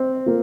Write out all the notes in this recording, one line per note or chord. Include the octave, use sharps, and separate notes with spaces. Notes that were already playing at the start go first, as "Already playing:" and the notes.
Already playing: C4
A#3 F4